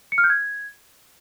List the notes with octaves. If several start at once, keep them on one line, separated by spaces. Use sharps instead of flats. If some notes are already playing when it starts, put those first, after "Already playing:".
C#7
F6
G6
G#6